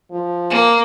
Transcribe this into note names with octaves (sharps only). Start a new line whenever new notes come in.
F3
A#3